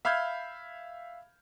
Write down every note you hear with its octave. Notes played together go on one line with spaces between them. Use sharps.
E5 F5 B5 F6 G6 G#6